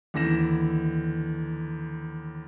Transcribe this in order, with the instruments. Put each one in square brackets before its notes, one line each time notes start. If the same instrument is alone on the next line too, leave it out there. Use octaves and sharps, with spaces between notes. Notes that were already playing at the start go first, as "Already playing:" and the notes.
[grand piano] D#2 D3 E3 A#6 E7